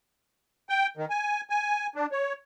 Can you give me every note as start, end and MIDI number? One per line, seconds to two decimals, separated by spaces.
0.69 0.87 79
0.97 1.05 51
1.10 1.41 80
1.50 1.87 80
1.96 2.06 62
2.12 2.33 73